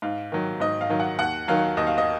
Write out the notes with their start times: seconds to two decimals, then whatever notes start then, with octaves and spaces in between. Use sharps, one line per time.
0.02 G#2 F5
0.32 D#3 F#3
0.60 G#2 D#5
0.81 F5
0.89 D#3 F#3
1.00 F#5
1.19 D#2 F#5
1.48 D#3 F#3 F5
1.77 D#2 D#5
1.87 F5
1.98 D#5